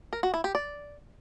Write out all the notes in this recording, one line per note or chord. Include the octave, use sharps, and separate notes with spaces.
A#4
F#4
E4
G4
D5